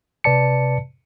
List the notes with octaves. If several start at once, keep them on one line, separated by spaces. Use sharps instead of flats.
C3 B4 D5 A5 C#7